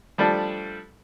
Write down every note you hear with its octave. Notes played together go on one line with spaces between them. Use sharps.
F3 G3 A3 D4